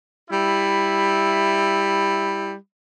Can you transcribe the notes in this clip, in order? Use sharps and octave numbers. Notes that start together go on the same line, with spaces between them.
G3 E4